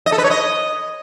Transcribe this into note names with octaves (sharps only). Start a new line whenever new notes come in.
D#5
A4
B4
C#5
D#5